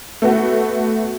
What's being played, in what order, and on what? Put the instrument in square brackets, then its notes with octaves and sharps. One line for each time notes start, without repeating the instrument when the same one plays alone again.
[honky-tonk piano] A3 B3 F#4